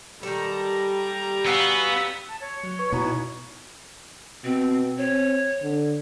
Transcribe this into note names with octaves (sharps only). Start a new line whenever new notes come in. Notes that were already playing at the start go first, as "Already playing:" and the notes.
D#3 G3 A4 A#5
B3 F#4 F5 G#5 E6
A5
C#5
F#3
B4 C#6
B2 D#4 E4 A#5 C#6
B2 C4
C4 C#5
D3